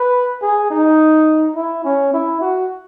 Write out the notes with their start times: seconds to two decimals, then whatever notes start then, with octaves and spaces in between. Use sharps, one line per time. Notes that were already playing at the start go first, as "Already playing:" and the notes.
Already playing: B4
0.42 G#4
0.71 D#4
1.56 E4
1.85 C#4
2.14 E4
2.41 F#4